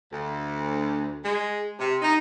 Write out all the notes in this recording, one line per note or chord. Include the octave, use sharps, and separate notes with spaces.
D2
G#3
C3
D#4